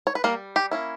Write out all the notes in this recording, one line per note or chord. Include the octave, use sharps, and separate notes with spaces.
C#5
B4
G3 A#3 A#4
G4
A#3 C#4 E4